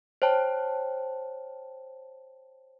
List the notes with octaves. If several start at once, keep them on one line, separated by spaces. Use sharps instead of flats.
C5 C#5 G5 A5